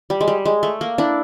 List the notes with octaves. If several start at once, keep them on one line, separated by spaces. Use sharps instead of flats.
G3
G#3
G3
G#3
A3
A#3
D4 E4